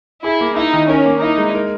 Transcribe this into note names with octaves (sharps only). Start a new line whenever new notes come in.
E4 G#4
A#3
D#4 E4
D#3
C#4 A#4
A#3
D#4 E4
G#3
A#4